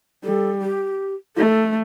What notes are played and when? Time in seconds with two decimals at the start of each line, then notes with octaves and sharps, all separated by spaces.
0.24 G3 A4
0.62 G4
1.36 A3 A4